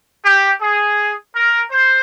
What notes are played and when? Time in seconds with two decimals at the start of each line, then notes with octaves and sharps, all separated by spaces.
0.24 G4
0.61 G#4
1.35 A#4
1.71 C5